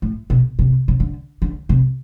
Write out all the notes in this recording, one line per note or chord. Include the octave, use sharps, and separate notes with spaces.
A2
B2
C3
C3
D3
D3
C3